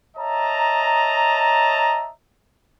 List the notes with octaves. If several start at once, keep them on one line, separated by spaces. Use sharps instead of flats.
C#5 D#5 E5 A5 A#5